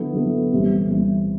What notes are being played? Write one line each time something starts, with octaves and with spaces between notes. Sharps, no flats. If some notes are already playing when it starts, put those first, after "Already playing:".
Already playing: D3 F#3 B3 E4 A4
D3 F#3 B3 E4 A4
C2 C3 E3 G3
C2 C3 E3 G3